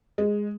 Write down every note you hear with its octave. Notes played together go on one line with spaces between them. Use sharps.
G#3